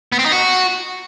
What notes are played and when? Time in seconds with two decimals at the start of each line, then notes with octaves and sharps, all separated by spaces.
0.12 B3
0.19 C4
0.25 D#4
0.32 F#4